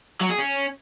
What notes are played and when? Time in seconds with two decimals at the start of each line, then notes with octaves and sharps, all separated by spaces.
0.21 F#3
0.30 G#4
0.39 C#4